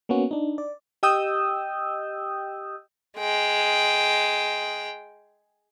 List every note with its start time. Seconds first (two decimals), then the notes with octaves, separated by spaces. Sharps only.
0.09 A#3 B3 C#4 F#4
0.31 D4 D#4
0.58 D5
1.03 G4 D#5 G5 D#6 E6 G6
3.18 G#3 G5